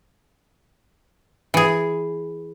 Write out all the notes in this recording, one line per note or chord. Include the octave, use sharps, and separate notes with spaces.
E3 G#4